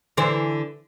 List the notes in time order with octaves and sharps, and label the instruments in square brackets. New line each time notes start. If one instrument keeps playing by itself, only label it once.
[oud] D3 E3 C5